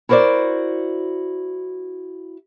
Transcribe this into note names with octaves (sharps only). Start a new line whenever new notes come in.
E4 F#4 A#4 C5 D5